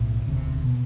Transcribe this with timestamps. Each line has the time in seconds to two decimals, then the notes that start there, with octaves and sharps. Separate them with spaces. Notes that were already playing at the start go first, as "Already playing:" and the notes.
Already playing: B1 A2
0.26 E1 D2 C3
0.64 B2